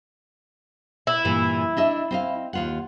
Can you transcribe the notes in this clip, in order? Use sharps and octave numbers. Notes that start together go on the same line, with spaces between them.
E4
G2 A#2 E3
D4 D#5 E5
C4 D#5 F5
D#2 F4 F#5